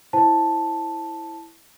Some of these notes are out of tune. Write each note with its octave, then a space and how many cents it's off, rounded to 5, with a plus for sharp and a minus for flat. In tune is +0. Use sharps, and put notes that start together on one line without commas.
E4 +0 C5 +20 A5 +0